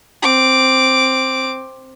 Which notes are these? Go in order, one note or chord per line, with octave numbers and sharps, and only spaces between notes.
C4 D6